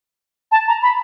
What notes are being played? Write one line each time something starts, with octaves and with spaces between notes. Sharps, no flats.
A5
A#5
B5